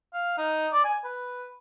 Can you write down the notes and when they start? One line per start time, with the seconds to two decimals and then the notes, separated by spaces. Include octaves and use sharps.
0.14 F5
0.38 D#4
0.73 D5
0.84 G#5
1.05 B4